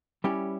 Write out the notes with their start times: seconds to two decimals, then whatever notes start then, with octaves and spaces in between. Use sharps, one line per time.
0.24 G3 C#4 E4 G4